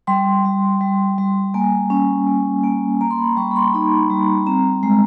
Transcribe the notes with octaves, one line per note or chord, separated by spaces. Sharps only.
G3 C6
G3
G3
G3
A#3 G#5
C#4
A#3
A#3
A#3 A#5
C6
B5
C6
G3 C#6
B5
C6
D#4 B5
G3
C4 A#5
G#3